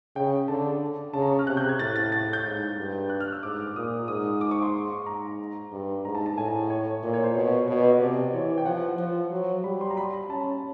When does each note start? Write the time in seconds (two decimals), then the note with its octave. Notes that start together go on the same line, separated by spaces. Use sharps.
0.16 C#3 G5
0.48 D3 A5
1.13 C#3 A5
1.22 A#5
1.30 C#6
1.39 F6
1.47 C3 F#6
1.57 G6
1.69 G#6
1.79 A2 A6
1.96 A6
2.12 A6
2.33 G6
2.45 G#2
2.77 G2
3.10 F#6
3.20 F6
3.33 E6
3.43 G#2 D6
3.67 D6
3.76 A#2 D#6
4.08 G#2 D#6
4.41 D6
4.51 C#6
4.62 C6
5.06 G#2 A#5
5.72 G2
6.05 G#2 A#5
6.15 A5
6.26 A5
6.37 A2 G#5
6.70 C#5
7.03 A#2
7.14 C#5
7.24 C5
7.35 B2 C#5
7.68 B2 C#5
7.78 D5
7.89 D#5
8.01 C3 D5
8.33 E3 C#5
8.58 G5
8.65 F3 F#5
8.98 F3
9.31 F#3
9.64 G3 B5
9.81 C6
9.91 A#5
9.97 B5
10.13 B5
10.29 C#4 A5